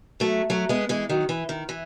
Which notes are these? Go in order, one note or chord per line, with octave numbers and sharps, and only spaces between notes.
F#3 A3
F#3 A3
G#3 B3
E3 G#3
D#3 F#3
E3
D#3
E3